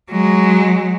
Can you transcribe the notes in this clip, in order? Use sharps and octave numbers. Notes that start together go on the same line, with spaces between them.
F#3 G#3